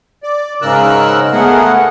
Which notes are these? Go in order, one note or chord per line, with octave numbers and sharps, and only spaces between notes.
D5
G#2 C#3 A#4 E6 F#6
A3 B3 G#4 A#4 F#5